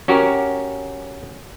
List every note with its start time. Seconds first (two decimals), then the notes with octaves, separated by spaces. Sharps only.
0.08 C#4 F#4 G4 A#4